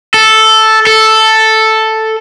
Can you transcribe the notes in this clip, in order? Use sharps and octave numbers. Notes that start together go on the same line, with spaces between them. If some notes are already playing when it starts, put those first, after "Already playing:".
A4
A4